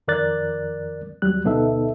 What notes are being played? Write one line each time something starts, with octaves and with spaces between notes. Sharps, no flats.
F2 D#3 A#4 D5 F#6 A6
D#2 F#3 G3 F#6
D2 B2 B3 D#4 A4 E5